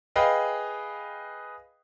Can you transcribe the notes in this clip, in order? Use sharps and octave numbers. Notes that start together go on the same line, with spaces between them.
G#4 B4 D#5 F5 G5